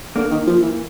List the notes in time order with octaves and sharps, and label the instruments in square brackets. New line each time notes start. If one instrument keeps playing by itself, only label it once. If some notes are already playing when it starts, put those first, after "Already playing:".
[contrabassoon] D3 [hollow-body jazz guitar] A#3
[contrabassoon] D#3
F3
E3